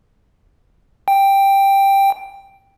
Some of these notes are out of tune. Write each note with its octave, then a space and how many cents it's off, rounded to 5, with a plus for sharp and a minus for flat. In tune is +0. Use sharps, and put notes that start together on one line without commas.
G5 +5